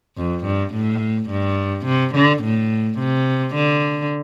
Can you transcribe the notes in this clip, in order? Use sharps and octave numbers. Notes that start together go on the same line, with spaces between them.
F2
G2
A2
G2
C3
D3
A2
C3
D3